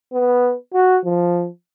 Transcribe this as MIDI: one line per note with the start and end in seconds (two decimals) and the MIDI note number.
0.13 0.54 59
0.74 0.98 66
1.05 1.47 53